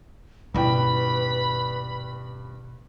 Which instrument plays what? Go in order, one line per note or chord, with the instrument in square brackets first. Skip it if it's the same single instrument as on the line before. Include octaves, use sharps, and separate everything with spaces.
[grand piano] D#1 G2 G5 [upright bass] B2 E4 [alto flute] B4 [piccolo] B5